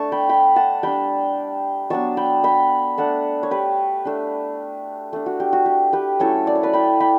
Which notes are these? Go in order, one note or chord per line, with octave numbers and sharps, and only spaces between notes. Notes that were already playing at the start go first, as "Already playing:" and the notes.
Already playing: A3 D4 A5 C#6
G5 B5
G5 B5
F#5 A5
G3 D4 G5 B5
F#3 B3 D4 A5 C#6
G5 B5
G5 B5
A3 D4 F#5 A5
C#5
G4 B4
A3 D4
A3 D4
F#4
G4
F#4
G4
G4 B4
F#3 A3 C#4 E4 A4 C#5
D5
C#5
B4 D5
G5 B5
G5 B5